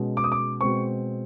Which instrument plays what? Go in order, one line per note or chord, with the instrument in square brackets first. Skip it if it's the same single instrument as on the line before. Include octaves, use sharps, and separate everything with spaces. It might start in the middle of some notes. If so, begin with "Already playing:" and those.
Already playing: [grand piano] B2 G#3 C#4
D6
D#6
D6
B2 G#3 C4 C#6